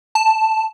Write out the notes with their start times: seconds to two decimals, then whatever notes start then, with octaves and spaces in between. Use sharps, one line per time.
0.15 A5